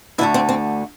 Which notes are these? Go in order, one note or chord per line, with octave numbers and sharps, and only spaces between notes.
D2 D3 A3 E4
C4
C4